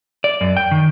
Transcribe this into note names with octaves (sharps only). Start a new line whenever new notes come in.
D5
F#2
G5
D#3